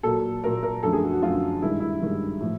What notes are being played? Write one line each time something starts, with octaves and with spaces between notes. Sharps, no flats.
A#2 F#3 A#3 A4
A#2 F#3 A#3 A#4
A#4
F#2 D3 F3 A3 A4
G#4
F#4
F#4
F#2 D3 F3 A3 F4
G2 D#3 G#3 E4
E4
G2 D#3 G#3
A2 F3